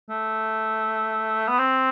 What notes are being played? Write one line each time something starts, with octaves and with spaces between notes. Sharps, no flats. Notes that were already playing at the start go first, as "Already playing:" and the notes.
A3
B3
C4